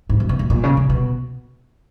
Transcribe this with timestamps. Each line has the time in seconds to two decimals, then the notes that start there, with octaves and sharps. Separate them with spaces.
0.09 G#2
0.20 F#2
0.29 B2
0.39 A#2
0.50 A#2
0.64 C#3
0.77 C#3
0.89 B2